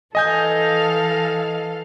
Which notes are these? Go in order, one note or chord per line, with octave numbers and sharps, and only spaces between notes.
E3 A4 D#5 F5 G#5 G6